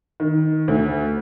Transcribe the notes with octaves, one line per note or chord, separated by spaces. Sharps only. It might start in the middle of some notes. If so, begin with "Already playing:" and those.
D#3
D2